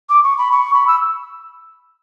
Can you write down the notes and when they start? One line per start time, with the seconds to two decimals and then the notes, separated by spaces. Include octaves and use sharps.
0.10 D6
0.24 C#6
0.38 B5
0.52 C#6
0.74 B5
0.87 E6